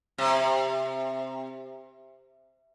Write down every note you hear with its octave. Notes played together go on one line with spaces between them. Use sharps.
C3